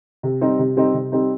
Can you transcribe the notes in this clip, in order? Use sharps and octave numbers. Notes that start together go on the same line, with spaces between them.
C3
G3 C4 D#4
C3
G3 C4 D#4
C3
G3 C4 D#4